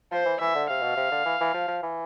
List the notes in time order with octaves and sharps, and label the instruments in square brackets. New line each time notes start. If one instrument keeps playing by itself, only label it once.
[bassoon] F3 [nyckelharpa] C5
[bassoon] E3
[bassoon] E3 [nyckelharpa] E5
[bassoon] D3
[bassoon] C3 [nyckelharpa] F5
[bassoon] B2
C3
D3
E3
E3
F3
F3
E3